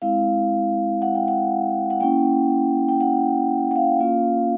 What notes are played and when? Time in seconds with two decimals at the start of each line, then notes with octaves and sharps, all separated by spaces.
0.02 G#3 C4 E4 F5
1.02 F#5
1.15 G5
1.28 F#5
1.90 F#5
2.00 A#3 C#4 E4 G5
2.89 G5
3.01 F#5
3.71 F#5
3.76 F5
4.00 A#3 C#4 F4